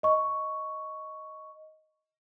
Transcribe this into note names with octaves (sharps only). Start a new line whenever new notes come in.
D#5 C#6